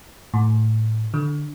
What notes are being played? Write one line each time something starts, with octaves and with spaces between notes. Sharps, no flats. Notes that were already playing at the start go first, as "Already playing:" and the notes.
A2
D3